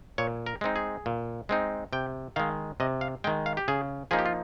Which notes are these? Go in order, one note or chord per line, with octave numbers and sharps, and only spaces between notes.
A#2 C#5
A#4
G#3 C4 D#4
G#4
A#2
G#3 C4 D#4
C3 G5
D#3 G#3 F5
C3 D#5
F5
D#3 G#3 G5
F5
G4
C#3 G#4
F3 A#3 D#4 G#4
G4
F4